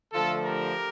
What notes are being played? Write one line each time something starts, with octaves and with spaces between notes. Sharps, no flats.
D3 F3 A3 F4 A4
G4 A#4